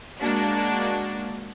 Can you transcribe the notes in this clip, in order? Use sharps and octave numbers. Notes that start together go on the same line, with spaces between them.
G#3 A#3 D4 F#4